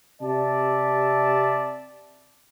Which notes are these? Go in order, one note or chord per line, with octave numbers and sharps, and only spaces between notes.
C3 G4 D5 E5 A5